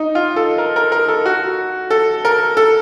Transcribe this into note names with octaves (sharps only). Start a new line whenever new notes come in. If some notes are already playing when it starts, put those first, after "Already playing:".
Already playing: D#4
F4
A4
A#4
A#4
A#4
A4
F#4
A4
A#4
A4